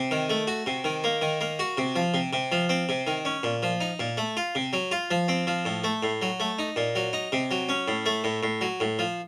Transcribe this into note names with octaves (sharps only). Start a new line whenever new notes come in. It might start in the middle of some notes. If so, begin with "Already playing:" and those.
Already playing: C3
D#3
A3
F#4
C3
D#3
A#3
D#3
A#3
F#4
C3
F3
C3
C3
F3
C4
C3
D#3
C#4
A#2
F3
D#4
A#2
A3
F4
C3
F#3
F4
F3
C4
F3
A2
A3
A2
F#3
A3
D#4
A#2
F#3
D#4
C3
F#3
C#4
A2
A3
A2
A2
F#3
A2
F3